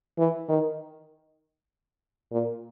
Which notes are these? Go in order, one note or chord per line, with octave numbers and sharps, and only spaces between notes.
E3
D#3
A#2